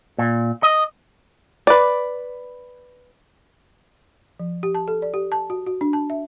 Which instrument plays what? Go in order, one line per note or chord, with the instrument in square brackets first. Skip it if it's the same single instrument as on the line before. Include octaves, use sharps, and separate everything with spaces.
[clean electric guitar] A#2
D#5
[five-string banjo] B4 D5
[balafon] F3
G4
A5
A4
D5
G4
A5
F#4
F#4
D4
A5
E5